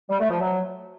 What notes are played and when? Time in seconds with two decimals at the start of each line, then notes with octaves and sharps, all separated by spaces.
0.10 G3
0.19 A3
0.29 F3
0.39 F#3